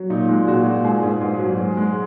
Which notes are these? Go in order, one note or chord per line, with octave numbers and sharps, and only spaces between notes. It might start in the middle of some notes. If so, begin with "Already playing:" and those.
Already playing: F#3
A#2 D#4
G#3
A#2 F#4
A#2
G#2 G#4
G#2
G#2
F#3
G#2
G#3